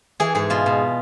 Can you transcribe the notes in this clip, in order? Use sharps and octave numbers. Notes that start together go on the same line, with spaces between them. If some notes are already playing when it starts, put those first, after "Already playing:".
E3 G#4
G#2 G#4
B2 F4
B2